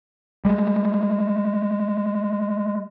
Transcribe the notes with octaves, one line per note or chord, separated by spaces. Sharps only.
G3 G#3